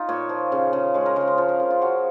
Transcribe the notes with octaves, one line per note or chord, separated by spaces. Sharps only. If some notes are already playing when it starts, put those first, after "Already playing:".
Already playing: D#4 F4
A#2 C#5
F3
C#3
C#3
G#3 C#5
A#4
C#3 C5
A#4
F3 C5
A#4
C#3
F4
F3 F#4